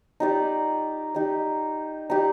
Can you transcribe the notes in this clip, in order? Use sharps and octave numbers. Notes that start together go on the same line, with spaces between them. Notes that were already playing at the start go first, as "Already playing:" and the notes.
D#4 G4 D5
D#4 G4 D5
D#4 G4 D5